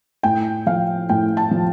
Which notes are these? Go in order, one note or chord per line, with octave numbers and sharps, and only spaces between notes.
A2 G5
F3 F5
A2 G5
A5
F3